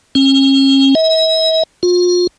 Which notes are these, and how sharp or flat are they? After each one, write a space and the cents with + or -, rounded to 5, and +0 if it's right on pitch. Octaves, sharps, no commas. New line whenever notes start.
C#4 -40
E5 -45
F4 +35